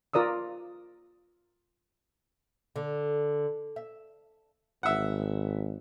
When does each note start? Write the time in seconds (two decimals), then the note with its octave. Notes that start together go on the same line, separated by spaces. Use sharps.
0.14 F4 A#4 D5 D#6 E6
2.76 D3
3.76 E5
4.83 G#1 E5 F#5